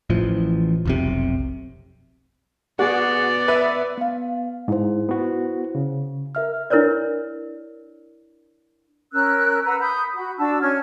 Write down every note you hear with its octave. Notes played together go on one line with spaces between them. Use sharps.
A1 A2 E3 F3
F1 B1 C3
B3 F#4 G#4 D5
B4 E5
B3 F5
G#2 E4 C5
B3 F#4
C#3
A#4 E5 F6
D4 E4 A#4 B4 C#5 D5
C#4 A#4 E6 F#6
B4 F#5 A#5 E6
B5 D#6 G6
F#4 B5
D4 F#4 A5 E6
C#4 C#5 F6 G#6